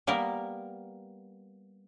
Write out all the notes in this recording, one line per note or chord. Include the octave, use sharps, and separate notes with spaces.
G3 A#3 B3 A#4